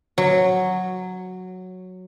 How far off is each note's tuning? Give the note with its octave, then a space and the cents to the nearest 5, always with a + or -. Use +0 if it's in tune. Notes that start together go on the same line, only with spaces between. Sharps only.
F#3 -5